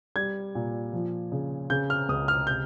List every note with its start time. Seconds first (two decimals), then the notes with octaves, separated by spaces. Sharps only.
0.16 G3 G#6
0.55 A#2
0.93 F3
1.32 C#3
1.70 C#3 G6
1.90 F6
2.09 C#2 D#6
2.28 F6
2.47 C3 G6